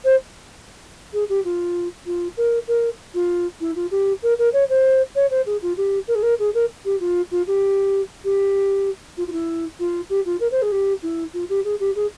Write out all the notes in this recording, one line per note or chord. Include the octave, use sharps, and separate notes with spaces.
C5
G#4
G4
F4
F4
A#4
A#4
F4
E4
F4
G4
A#4
A#4
C#5
C5
C#5
C5
G#4
F4
G4
A#4
G#4
A#4
G#4
A#4
G4
F4
F4
G4
G4
F4
F4
E4
F4
G4
F4
A#4
C5
G#4
G4
E4
F4
G4
G#4
G4
G#4